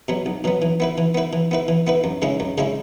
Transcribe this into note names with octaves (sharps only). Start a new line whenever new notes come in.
B2 F#3 B3
B1
B2 F#3 B3
E3
B3 E4 B4
E3
B3 E4 B4
E3
B3 E4 B4
E3
B3 E4 B4
F#2
C#3 G#3 C#4 E4
F#2
C#3 G#3 C#4 E4